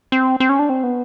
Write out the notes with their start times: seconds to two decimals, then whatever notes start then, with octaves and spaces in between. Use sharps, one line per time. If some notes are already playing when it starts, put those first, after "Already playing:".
0.12 C4
0.40 C4
0.49 C#4
0.59 D4
0.69 C4
0.83 B3